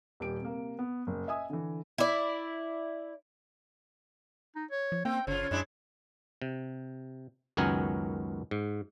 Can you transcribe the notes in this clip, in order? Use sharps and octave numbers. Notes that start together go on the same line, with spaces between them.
D#1 G4 D7
C3 A#3
B3
F#1
D#5 E5 G#5 D#6
D3 E3
E4 D5
D#4
C#5
F3
A#3 C4 G5
G1 C#3 F4 C#5
F#2 G#3 D4 E4
C3
C#2 F#2 D#3 B3 A#4 G#5
G#2